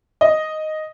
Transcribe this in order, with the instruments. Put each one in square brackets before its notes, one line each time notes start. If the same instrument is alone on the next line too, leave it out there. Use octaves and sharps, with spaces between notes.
[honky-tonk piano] D#5